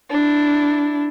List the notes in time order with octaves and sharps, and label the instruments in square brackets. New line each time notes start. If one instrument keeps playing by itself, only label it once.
[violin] D4 E4